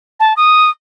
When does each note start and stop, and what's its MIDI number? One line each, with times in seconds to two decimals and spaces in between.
0.20 0.33 81
0.37 0.69 87